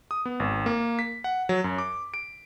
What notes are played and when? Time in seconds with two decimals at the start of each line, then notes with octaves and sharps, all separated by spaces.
0.11 D#6
0.26 B3
0.40 G#1
0.66 A#3
0.99 B6
1.24 F#5
1.49 F#3
1.64 F#2
1.78 D6
2.14 D7